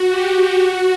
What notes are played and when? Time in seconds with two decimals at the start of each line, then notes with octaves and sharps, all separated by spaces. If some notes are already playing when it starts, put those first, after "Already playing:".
Already playing: F#4
0.11 G4
0.56 F#4